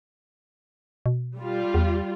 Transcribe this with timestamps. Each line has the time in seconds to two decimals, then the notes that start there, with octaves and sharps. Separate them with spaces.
1.06 B2
1.38 G3 F4
1.74 E2